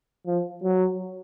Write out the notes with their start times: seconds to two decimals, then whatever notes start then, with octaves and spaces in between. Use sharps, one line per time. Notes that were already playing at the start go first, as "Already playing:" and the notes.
0.27 F3
0.63 F#3